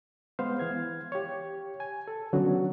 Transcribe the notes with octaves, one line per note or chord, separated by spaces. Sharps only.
G#3 B3 C5 F5
E3 F5 G#6
G4 C#5
G#5
A4
D3 F#3 B3 C#4 F#4